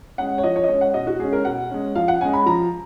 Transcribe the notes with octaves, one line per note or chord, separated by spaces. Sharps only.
G#3 C#4 F#5
C#5
F3 D#5
C#5
D#5
G#3 C#4 C#5
F#5
B2 D#5
F#4
G#3 C#4 G#4
A#4
B2 F#5
G#3 C#4
F3 F5
F#5
G#3 C#4 G#5
B5
F3 A#5